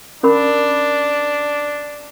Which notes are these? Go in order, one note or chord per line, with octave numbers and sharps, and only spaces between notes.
C#4 D4 A#4 B5